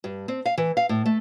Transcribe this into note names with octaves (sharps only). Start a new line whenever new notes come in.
G2
C4
F5
E3
F5
A2
A3